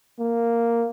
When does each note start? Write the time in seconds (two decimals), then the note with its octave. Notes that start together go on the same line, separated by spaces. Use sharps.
0.19 A#3